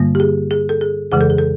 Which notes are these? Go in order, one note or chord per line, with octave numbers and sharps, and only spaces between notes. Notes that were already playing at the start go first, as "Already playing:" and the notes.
Already playing: G2 D3 G3 A#3
G4
G#4
G#4
A4
G#4
F2 C#3 E3 G#3 G#4
A4
G#4
A4